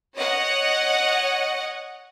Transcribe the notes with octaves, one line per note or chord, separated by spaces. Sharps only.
C#5 D#5 F#5